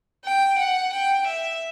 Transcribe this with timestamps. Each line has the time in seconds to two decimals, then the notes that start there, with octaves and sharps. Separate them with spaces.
0.25 G5
0.59 F#5
0.93 G5
1.27 E5